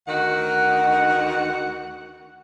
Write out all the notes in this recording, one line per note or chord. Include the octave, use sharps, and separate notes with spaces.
D2 D#3 F#4 F#5